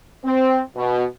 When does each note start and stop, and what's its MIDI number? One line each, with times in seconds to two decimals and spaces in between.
0.24 0.60 60
0.76 1.04 47